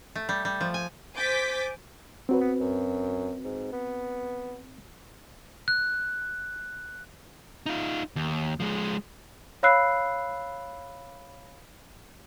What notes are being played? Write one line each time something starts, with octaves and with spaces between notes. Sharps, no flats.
A3
G3
G3
F3
G#5
C5 G#5 D6 G6 A6 B6
F#3 C4 F#4 B4
B3
F#2
G#2
B3
F#6
D#4 F4
D#2
F3 G#3
C#5 F5 B5 E6 F#6 C7